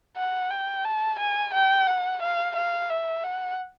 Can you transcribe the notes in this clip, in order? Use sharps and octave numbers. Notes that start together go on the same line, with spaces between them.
F#5
G5
A5
G#5
G5
F#5
F5
F5
E5
F#5